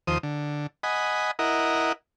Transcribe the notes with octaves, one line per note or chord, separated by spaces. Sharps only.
D#2 F3 C5 D#6
D3
D#5 F#5 G#5 B5
E4 A#4 D#5 F#5